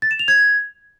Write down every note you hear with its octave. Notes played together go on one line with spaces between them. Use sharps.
A6
E7
F7
G#6